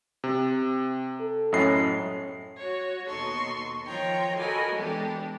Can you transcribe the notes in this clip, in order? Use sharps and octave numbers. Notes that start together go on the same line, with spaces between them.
C3
A4
F#2 A2 B3 C#4 D#5 C7
F#4 C#5
D#2 B2 D#4 A4 C6 C#6
D#3 F3 F4 C#5 G5 A#5
F#4 A4 A#4 D#5 G#5 B5
E3 G#3 B3 D4 G4 A4